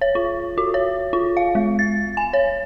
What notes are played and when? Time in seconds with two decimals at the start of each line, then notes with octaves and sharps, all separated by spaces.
0.01 C#5
0.15 F4
0.58 F#4
0.74 C#5
1.13 F4
1.37 F5
1.55 G#3
1.79 A6
2.17 G#5
2.33 C#5